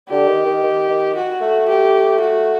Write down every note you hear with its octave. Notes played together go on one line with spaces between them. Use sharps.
D3 G4
D#3
D#3
D#3
D#3
F#4
A3
G4
F#4